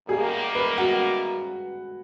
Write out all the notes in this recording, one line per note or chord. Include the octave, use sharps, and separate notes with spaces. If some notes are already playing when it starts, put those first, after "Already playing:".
F#2 D#3 G3 A#3 G#4
B4
F#4